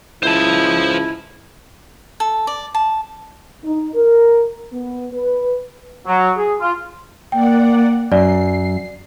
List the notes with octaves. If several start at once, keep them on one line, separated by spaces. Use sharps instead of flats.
C#2 E4 C5 A5
A4
D5
A5
D#4
A#4
B3
B4
F#3
G#4
F4
A#3 D5 F#5 G5
F#2 D5 C7